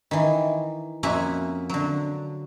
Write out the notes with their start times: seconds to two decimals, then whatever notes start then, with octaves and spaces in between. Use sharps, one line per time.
0.11 D#3 E3
1.03 F2 A#3 C#4 F#4 E5 G#5
1.69 D3 F#3